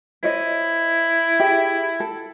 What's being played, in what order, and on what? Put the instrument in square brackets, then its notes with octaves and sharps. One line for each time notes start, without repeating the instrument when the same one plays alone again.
[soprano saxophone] E4 [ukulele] C5 C#5 D#5
[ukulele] G4 G#4 E5
A4